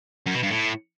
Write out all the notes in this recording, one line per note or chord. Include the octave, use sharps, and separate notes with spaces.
F#2
B2
G2
A2